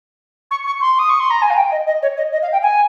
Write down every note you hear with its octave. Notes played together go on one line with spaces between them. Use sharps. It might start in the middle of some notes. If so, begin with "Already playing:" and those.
C#6
C#6
C6
D#6
C#6
C6
A#5
G#5
F5
G5
D#5
D#5
C#5
D#5
D#5
F5
G5
G#5